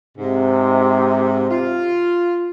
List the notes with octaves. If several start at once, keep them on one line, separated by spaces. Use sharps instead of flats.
G#2 C3
F4